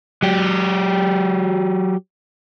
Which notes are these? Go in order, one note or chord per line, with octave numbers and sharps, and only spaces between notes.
F#3 G4